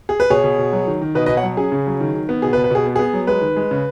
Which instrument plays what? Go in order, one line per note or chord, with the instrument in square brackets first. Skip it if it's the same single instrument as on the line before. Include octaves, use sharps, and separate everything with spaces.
[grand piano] G#4
B4
B2 G#4 C#5
B2
B2
F#3
D#3
D#3
B2 B4 D#5
B4 D#5
B2
C#5 F#5
F#3
C#4 G#4
C#3
F#3
D#3
D#3
B3
B2 G#4
B4
B2
B4
B2 G#4
B3
B3 G#4
F#3
G#3 B4
D#3
G#3
C#3